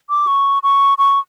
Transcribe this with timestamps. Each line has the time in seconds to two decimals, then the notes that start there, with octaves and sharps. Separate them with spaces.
0.10 D6
0.27 C#6
0.63 C#6
0.98 C#6